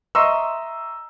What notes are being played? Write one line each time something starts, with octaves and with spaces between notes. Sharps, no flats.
D#5 E5 A#5 C6 C#6 E6